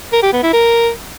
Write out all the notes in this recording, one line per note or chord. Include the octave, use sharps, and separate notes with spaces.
A#4
G4
B3
E4
A#4